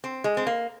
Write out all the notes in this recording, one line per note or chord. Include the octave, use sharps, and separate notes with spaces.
C4
G#3
C4
A#3